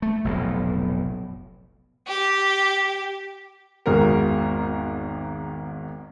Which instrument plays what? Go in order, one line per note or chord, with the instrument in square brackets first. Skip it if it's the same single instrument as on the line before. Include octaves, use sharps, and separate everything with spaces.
[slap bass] A3
F1 B1 A2
[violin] G4
[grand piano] G#1 E2 G#2 F#4 G#4 A#4